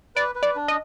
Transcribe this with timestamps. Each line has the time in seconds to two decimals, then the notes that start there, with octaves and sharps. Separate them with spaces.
0.16 B4 D5
0.35 B4
0.43 D5
0.55 D4
0.68 D#5